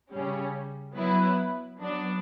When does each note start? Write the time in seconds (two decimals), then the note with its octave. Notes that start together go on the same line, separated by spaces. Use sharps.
0.11 C#3 G3 C#4
0.94 F#3 B3 E4 B4
1.78 F#3 B3 D4